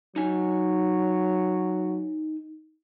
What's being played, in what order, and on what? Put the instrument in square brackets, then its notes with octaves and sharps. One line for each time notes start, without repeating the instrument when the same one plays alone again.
[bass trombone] F#3 [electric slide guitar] D#4 G#5